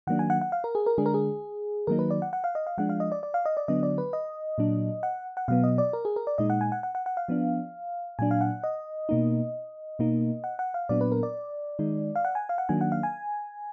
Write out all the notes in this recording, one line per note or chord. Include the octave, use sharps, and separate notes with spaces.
D#3 F#3 A#3 D4 F#5
G#5
F#5
F#5
F5
A#4
G#4
A#4
D3 G#3 D4 G#4
A#4
G#4
D#3 F#3 A#3 D#4 A#4
B4
D5
F#5
F#5
F5
D#5
F5
F3 G#3 D4 F#5
F5
D#5
D5
D5
F5
D#5
D5
D3 F#3 B3 D4 D#5
D5
B4
D#5
A#2 F#3 D4
F#5
F#5
B2 F#3 B3 F5
D#5
D5
A#4
G#4
A#4
D5
A#2 G#3 D#4 D#5
F#5
G#5
F#5
F#5
F#5
F#5
F5
F3 B3 D4
A#2 F#3 D4 G#5
F5
F#5
D#5
B2 A#3 D#4
B2 A#3 D#4
F#5
F#5
F5
A#2 F#3 B3 D4 D5
B4
A#4
D5
D#3 G#3 D#4
F5
F#5
G#5
F5
F#5
D#3 F#3 A#3 D4 G#5
F#5
F5
G#5